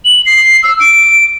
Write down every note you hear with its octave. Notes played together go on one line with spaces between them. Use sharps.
F#7
C7
E6
D7